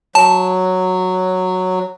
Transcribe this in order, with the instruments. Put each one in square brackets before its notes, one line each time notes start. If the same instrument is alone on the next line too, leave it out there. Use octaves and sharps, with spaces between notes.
[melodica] F#3 [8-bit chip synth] A5